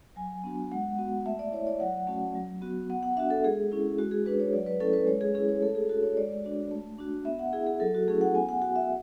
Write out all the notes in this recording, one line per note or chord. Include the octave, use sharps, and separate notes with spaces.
F#3 G#5
B3 D4 F#4
G#3 F#5
B3 F#4
A3 E5
D5
E4 C#5
D5
F#3 F#5
A3 C#4 F#4
F#3
B3 F#4
B3 F#5
F#5
D4 F#4 E5
A4
G#3 G#4
C#4 E4
G#3 F#4
G#4
D4 F#4 B4
C#5
F#3 D5
B4
A3 C#4 E4 A4
B4
G#3 C#5
G#4
C#4 E4 G#4
C#5
A3 A4
G#4
D4 F#4 A4
C#5
G#3 D5
D4 F#4
A3
D4 F#4
B3 E5
F#5
E4 G#4
G#4
F#3 A4
F#4
A3 C#4 E4 G#4
F#5
B3 G#5
F#5
F#4 F#5
E5